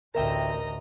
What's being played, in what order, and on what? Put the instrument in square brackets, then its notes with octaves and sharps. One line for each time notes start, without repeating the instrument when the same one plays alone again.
[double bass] A1 D2 [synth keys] A#4 E5 G5 [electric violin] D#5 A#5